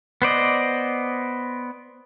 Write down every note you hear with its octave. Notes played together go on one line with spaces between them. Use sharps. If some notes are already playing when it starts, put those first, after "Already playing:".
B3 C5 D5 D#5